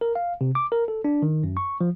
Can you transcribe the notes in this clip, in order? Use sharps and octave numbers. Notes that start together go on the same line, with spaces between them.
A#4
F5
C3
D6
A#4
A4
D4
D#3
F#2
C#6
F3